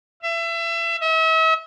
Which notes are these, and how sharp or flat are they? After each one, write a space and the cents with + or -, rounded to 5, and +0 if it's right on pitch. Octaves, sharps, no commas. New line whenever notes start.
E5 +30
E5 -40